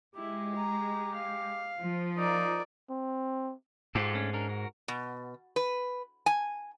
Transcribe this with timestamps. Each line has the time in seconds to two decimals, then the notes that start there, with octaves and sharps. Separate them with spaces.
0.15 G#3 E4 G4
0.56 A#5
1.15 F5
1.78 F3
2.17 D#4 A#4 D5
2.90 C4
3.95 G#2 F4 G4 A4
4.14 A3 C#4 D4
4.33 C#4 D4 A#4
4.49 F#4 A#4
4.88 B2
5.56 B4
6.26 G#5